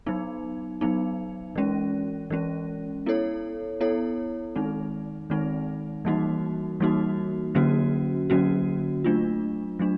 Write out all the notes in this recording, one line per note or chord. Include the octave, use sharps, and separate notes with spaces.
F#3 B3 D#4
F#3 B3 D#4
E3 G#3 C#4
E3 G#3 C#4
B3 E4 A4 C#5
B3 E4 A4 C#5
D#3 G#3 C4 D#4
D#3 G#3 C4 D#4
E3 G3 A#3 D#4 F#4
E3 G3 A#3 D#4 F#4
D3 F#3 A#3 C#4 F#4
D3 F#3 A#3 C#4 F#4
F#3 A3 D4 F4
F#3 A3 D4